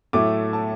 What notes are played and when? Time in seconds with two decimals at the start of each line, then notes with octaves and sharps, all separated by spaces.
0.13 A2 F#3 A3 D6
0.53 A5